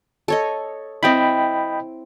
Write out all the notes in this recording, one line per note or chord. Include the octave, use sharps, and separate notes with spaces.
A4 C#5 D#5
C4 E4 D#5 G5 B5